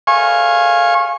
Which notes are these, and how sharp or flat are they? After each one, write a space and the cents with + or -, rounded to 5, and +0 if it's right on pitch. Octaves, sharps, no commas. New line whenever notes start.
F5 +0 G#5 +0 C#6 -30